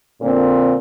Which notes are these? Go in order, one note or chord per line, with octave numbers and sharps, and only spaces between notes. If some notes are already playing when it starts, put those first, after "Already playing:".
A#2 D3 C4